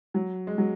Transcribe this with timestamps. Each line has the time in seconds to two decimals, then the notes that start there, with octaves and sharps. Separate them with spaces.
0.14 F#3
0.47 G#3
0.58 F#3